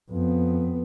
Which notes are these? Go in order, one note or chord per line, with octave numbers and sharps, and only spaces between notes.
F2 B3